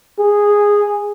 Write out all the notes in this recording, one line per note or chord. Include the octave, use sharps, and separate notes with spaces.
G#4